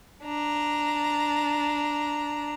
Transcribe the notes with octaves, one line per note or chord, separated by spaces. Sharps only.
D4 A#5